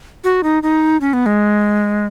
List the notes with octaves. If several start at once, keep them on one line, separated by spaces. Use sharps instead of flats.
F#4
D#4
D#4
C#4
B3
G#3